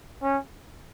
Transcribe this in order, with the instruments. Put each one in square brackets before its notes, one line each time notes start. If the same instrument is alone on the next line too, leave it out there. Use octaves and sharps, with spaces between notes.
[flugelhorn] C#4